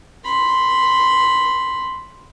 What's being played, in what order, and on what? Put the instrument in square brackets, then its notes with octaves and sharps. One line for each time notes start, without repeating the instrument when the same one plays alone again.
[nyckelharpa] B5 C6